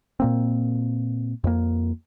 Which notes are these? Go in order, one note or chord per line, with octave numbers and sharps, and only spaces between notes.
A#2 A#3 C4
F2 A#3